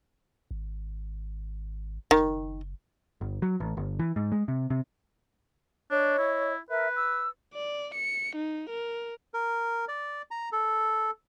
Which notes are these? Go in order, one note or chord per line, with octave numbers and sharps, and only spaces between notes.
G#1
F#1 D#3
G1
F#3
A1
G1
E3
G#2
G#3
C3
C3
D4 C#5 D#5
E4
A#4 B4 E5
E6
D5
C#7
D#4
A#4
A#4
D5
A#5
A4